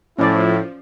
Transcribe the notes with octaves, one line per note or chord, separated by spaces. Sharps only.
A2 F3 C#4 E4 D5